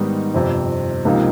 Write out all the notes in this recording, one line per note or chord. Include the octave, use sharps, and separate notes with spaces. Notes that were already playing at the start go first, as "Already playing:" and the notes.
Already playing: G#2 D#3 G3 B3 D#4
G1 F2 C3
C#2 C3 F3 A#3 D#4